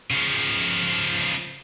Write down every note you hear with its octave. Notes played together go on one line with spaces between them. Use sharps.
C#3 F3